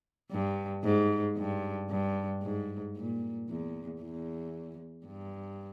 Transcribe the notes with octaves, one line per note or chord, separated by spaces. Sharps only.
G2
G#2
G2
G2
G#2
A#2
E2
E2
G2